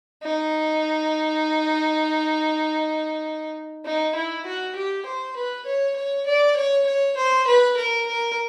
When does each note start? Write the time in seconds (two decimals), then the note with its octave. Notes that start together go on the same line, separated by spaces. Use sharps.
0.23 D#4
3.85 D#4
4.16 E4
4.46 F#4
4.76 G4
5.06 C5
5.36 B4
5.66 C#5
5.96 C#5
6.27 D5
6.56 C#5
6.87 C#5
7.17 C5
7.47 B4
7.77 A#4
8.07 A#4